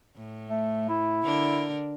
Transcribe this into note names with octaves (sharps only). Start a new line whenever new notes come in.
A2
A3
E4
D3 D4 A#4